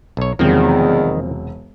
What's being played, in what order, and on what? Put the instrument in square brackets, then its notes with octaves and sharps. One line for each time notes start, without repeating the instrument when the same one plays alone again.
[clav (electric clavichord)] B1 C#5
[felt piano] E1 C3 F#3 [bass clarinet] E2 [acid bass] D#3 [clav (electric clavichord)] F3 A#3 C4